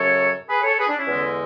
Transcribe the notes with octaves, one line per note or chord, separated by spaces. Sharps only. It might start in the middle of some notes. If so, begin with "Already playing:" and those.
Already playing: F#2 C#3 F#3 A4 C#5
G#4 B4
A4 C#5
G#4 B4
D4
C#4 E4
E2 D3 G#3